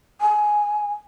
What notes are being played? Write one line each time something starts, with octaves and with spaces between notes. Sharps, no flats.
G#5